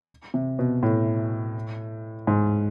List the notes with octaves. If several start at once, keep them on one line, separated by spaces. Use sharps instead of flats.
C3
B2
A2
G#2